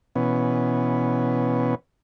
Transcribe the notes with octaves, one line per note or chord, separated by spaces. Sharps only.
B2 E3 B3 C#4